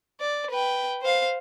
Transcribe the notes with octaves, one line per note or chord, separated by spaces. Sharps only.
D5
B4 G5
C5 F5